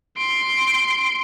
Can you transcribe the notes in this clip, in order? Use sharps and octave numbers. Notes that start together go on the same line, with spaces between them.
C6 D7